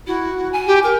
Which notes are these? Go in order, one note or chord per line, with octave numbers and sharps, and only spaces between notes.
E4 F#4
G#5
G4
A#4 G5